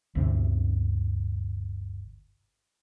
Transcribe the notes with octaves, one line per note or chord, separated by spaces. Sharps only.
G1 D2 C3